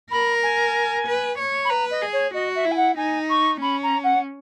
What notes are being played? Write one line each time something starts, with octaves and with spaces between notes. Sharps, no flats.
A#4 B5
G#5
B4
C#5
B5
B4 A#5
D#5
G#4
C#5
F#4 D#5
E5
E4
G#5
F#5
D#4 G#5
C#6
C#4 B5
A#5
F#5